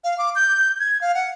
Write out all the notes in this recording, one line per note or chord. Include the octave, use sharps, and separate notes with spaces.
F5
D6
G6
G#6
F5
F#5